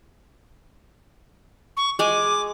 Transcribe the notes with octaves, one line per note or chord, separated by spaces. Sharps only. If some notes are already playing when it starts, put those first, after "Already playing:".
C#6
G#3 G#5 D6